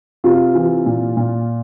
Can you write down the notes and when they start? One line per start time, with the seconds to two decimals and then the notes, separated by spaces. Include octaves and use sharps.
0.24 C3 F4
0.55 E3
0.86 A#2
1.17 A#2